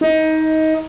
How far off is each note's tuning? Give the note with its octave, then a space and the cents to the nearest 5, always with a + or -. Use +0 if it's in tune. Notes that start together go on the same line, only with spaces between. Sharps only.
D#4 +20